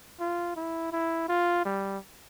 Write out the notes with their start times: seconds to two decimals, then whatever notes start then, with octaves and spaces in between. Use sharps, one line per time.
0.20 F4
0.56 E4
0.92 E4
1.29 F4
1.66 G3